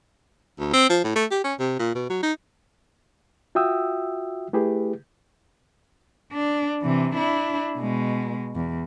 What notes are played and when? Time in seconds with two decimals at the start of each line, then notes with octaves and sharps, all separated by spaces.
0.59 D2
0.73 C4
0.90 F3
1.04 A2
1.16 A3
1.31 G4
1.44 C#4
1.59 C3
1.79 A#2
1.95 B2
2.10 F#3
2.22 D#4
3.55 F4 F#4 E5 G5 D#6 E6
4.53 A3 E4 G4 G#4 B4
6.32 D4
6.82 C3 E3
7.16 D4 E4
7.78 B2 G#3
8.56 E2